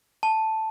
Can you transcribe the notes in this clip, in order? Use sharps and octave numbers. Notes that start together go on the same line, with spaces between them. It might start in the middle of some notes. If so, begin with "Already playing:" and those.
A5